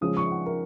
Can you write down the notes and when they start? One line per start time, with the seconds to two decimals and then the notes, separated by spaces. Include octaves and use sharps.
0.01 C#3 F3 G#3 C#4 D#6
0.17 C#6
0.31 F#5
0.46 A#4